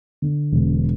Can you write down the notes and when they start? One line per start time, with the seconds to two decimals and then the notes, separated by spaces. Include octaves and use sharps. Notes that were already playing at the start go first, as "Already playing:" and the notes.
0.22 D3
0.52 E1